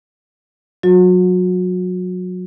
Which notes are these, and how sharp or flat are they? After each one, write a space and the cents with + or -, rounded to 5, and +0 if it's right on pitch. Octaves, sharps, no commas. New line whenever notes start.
F#3 -20 F#4 -35